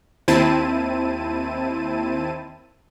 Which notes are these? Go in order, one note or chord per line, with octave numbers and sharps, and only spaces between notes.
D#2 C4 E4 A5 D#7